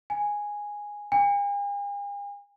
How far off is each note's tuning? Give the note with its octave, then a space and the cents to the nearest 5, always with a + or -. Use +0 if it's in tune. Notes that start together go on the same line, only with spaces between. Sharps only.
G#5 -5
G#5 -45